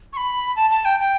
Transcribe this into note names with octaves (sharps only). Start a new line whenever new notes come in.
C#6
B5
A5
A5
G5
G5